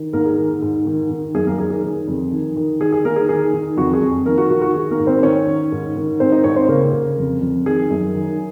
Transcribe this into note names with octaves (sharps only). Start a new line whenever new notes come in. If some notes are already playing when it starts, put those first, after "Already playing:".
Already playing: D#3
G#2 A#3 A#4
G#4
D#3
G#2
D#3
D#3
F#2 G#4
A#3 A#4
D#3 G#4
G#4
D#3
F2
D#3
D#3
D#3 G#4
G#4
D#3 A#3 A#4
G#4
D#3 G#4
D#3
F2 F#4
G#4
F2
D#3 A#3 A#4
F#4
D#3 F#4
F#4
D#3 G#4
A#3 A#4
G#2
C4 C5
D#3 C#4 C#5
D#3
G#2
D#3
G#2 C4 C5
D#4 D#5
G#2 C#4 C#5
C4 C5
C#3 A#3 A#4
C#3
F2
F2
D#3 G#4
F#2
D#3